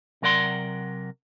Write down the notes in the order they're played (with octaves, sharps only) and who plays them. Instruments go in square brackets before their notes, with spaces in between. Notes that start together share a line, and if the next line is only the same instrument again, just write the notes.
[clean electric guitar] C3 F#3 A#4 D5 F#5 C6